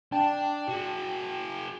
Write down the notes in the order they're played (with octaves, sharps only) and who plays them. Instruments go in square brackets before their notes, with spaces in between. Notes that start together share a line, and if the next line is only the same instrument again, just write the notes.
[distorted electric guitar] D4 [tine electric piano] G5 A5
[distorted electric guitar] F#4 G#4